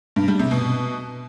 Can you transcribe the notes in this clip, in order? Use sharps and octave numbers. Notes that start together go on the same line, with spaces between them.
G2
G3
C3
B2